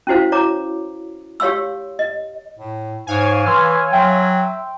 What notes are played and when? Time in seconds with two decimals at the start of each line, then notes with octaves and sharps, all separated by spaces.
0.07 C#4 E4 F#4 C5 F5
0.32 C#5 A#5 D6
1.40 G4 C#5 F5 C6 E6
1.99 D#5
2.59 A2
3.07 G#2 C#5 F5 G#5
3.46 E3 C6 E6 F6
3.93 F#3 E5 G5 C6